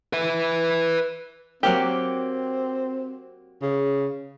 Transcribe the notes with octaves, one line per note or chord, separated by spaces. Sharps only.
B4 E5
F#3 A#3 C4 G4
C#3